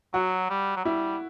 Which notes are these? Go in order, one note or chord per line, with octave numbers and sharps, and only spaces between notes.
F#3 F#4
G3
F#3
G3 E4